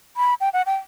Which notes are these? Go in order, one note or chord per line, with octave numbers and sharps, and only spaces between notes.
B5
G5
F#5
G5